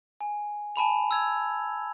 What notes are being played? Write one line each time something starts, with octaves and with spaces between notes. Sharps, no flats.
G#5
G#5 A5 B5 F7
E6 G#6 F7